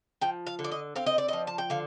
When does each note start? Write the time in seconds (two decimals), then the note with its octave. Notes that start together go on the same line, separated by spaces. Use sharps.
0.21 F3 G5
0.47 F5
0.59 D3
0.64 D5
0.72 D#5
0.96 C4 F5
1.06 D#5
1.18 D5
1.28 F3 D#5
1.47 A5
1.58 G5
1.70 D3 F5